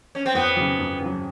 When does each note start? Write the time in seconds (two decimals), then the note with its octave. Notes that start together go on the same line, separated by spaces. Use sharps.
0.15 C#4
0.26 C4
0.34 F2 B3
0.56 C#3 F#3
0.79 F2
1.01 C#3
1.06 F#3